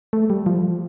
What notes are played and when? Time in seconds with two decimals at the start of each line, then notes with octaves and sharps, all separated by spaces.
0.13 A3
0.30 G3
0.46 F3